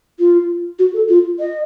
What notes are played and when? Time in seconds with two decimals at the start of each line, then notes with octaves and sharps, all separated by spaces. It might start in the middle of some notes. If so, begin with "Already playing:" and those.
0.19 F4
0.79 F#4
0.93 A4
1.09 F4
1.40 D#5